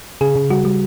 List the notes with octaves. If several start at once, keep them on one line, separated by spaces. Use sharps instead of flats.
C#3 G#4
C#3
G3 F#4
G3